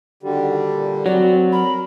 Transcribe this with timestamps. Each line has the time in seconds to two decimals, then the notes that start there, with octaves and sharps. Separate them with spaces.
0.23 D3 D#3 G3 F#4
0.73 A#2
1.06 F#3 C4 F#4 D5
1.52 A#4 B5